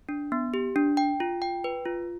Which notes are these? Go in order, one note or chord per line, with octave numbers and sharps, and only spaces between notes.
D4
B3
G4
D4
G5
F4
G5
B4
F4